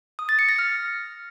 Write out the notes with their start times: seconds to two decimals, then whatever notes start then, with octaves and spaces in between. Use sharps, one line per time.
0.19 D#6
0.29 A6
0.39 C#7
0.49 A#6
0.59 F6